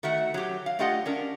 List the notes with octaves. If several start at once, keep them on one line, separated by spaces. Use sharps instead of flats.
D#3 A3 F#4 E5 F#5
F#3 G4
F5
A3 D4 F4 G4 D#5 F#5
C#4 D4 A#4